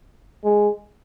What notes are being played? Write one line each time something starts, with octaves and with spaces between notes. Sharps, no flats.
G#3